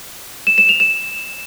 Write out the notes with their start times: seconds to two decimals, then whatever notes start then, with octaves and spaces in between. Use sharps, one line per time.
0.47 E7
0.58 E7
0.69 F7
0.80 E7